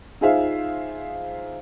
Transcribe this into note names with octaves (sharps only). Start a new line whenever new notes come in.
D#4 F4 G#4 C5 E5 F5